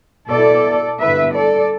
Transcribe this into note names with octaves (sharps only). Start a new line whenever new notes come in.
B2 B3 E4 A4 D5
G2 D3 B3 E4 B4 E5
A4 D5